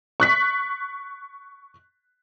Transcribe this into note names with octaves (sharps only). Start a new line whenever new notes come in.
C#6 F#6 B6